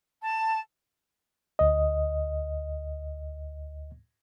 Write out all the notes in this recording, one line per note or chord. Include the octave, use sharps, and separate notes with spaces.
A5
D2 D#5